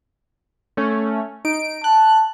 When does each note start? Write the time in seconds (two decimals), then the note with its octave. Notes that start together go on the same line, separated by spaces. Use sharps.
0.77 A3 C#4
1.45 D#4 D7
1.84 A5 F#6